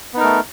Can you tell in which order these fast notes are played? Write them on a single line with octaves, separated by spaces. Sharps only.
B3 D#4 A#4 A3